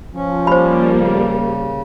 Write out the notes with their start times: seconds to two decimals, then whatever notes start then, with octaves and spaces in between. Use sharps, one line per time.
0.15 F3 C#4
0.47 G3 A#3 C5 B5
0.95 C#3